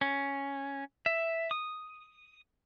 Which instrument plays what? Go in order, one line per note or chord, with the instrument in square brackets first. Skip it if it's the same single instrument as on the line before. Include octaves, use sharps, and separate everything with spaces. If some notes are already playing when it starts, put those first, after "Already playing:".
[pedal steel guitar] C#4
E5
D#6